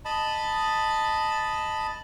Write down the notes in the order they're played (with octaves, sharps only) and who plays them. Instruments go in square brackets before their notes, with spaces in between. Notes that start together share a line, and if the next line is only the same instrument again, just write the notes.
[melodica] D#5 A5 B5